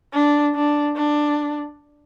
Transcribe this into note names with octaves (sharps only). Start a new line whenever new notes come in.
D4
D4
D4